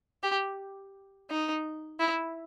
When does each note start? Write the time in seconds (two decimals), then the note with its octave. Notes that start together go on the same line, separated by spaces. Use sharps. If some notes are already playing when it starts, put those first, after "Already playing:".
0.23 G4
1.30 D#4
2.00 E4